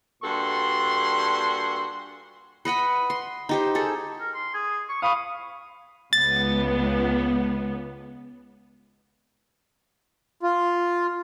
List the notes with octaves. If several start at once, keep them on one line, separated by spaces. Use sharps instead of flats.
G2 A#2 F#4 A4 C6
B4 D#5 F#5 B5
C6
D#4 G4 C5
G#4 A4
A#4
C6
G#4
C#6
F5 B5 C#6 D#6
C#2 B3 A6
F4